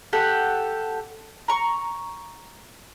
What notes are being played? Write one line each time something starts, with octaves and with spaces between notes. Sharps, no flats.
G4 A4 F#5
A#5 C#6